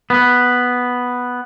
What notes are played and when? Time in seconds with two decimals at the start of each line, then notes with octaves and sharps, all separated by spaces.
0.10 B3